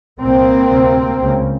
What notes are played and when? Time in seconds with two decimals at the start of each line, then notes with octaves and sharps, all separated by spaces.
0.19 C2 A#2 A#3 C4
0.71 D2 C3
1.22 C#2 C#3